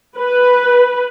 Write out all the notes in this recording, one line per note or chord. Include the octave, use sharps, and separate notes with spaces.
B4